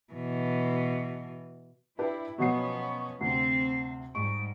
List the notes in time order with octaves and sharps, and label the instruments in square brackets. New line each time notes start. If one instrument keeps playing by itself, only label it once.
[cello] B2 E3
[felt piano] D4 G4 B4 [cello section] E4
[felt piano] B2 F#3 C7 [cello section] F3 B3 C#4 [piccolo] C#6
[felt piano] D2 C3 [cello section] C4 [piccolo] C7
[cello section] G#2 G3 [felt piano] C#6 [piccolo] D7